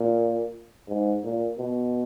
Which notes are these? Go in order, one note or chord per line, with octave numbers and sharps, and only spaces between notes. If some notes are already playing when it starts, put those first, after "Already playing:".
Already playing: A#2
G#2
A#2
B2